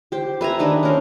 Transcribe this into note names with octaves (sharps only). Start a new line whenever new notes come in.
G4 C5
B4 E5 G#5 A#5
D#3 D4 D#4 B4
C#4 A#4 C5